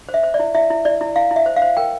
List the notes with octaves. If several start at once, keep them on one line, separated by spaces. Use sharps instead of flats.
C5
E5
C5
D5
E4
E4 E5
E4
E4 D5
E4
E4 F5
E4
E5
C5
F5
C5
A#4 G5